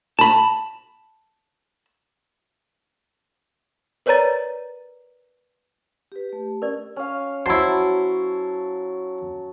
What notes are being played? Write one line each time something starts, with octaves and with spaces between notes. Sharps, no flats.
A5 B5
A#4 B4 C#5 D5 A#5 A6
G4 B4
A3 G4
C#4 A#4 D5
C#4 F5
F#3 E4 C5 A5